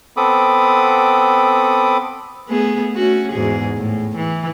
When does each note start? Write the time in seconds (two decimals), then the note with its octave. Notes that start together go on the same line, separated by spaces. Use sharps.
0.17 B3 C4 A4 B5 D6 D#6
2.48 A3 B3 G#4
2.96 A3 C#4 F#4
3.32 E2 G#2 G#4
3.77 A2
4.16 E3